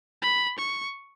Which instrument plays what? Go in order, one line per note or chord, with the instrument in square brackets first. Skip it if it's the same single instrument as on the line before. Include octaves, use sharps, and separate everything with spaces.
[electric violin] B5
C#6